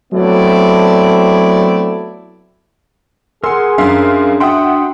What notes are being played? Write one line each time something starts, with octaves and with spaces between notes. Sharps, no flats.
F#3 A3 B3 C4 E4 D5
G#4 A#4 F#5 G#5 C6 E6
F#2 D4 A#4 E5 F5 C6
F#4 E5 F#5 G5 C6 D#6